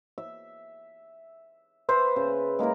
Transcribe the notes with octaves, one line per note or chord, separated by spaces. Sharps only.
E5
B4 C5 E5
C#3
G#3 A#3 E4 A#4